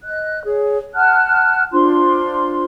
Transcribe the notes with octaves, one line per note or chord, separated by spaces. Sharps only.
D#5 F#6
G#4 C#5
F#5 A5 F6 F#6
D4 F4 C5 C6